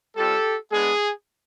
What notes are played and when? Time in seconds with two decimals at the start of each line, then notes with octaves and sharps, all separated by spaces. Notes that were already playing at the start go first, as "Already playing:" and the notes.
0.16 G3 C4 F4 G4 A4
0.72 G#3 B3 D4 G#4